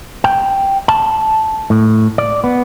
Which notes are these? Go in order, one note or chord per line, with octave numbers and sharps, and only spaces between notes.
G5
A5
A2
D5
B3